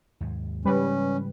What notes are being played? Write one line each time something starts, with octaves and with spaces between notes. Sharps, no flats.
D#2 G#2
G#2 C#3 E3 G3 C#4 B4